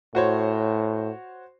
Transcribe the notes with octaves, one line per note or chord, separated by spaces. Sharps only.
A2 F#4 C5 C#5